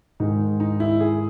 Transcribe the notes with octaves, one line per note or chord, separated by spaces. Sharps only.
G#2 D#3 G#3 D#4
D#4
E4
G#4